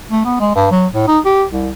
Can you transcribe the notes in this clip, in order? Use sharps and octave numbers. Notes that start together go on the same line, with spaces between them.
A3
B3
G#3
G2
F#3
A2
D#4
G4
C2